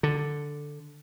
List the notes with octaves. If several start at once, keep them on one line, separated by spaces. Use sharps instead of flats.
D3